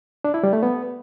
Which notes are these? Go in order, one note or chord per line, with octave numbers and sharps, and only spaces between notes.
D4
E4
G3
A3
B3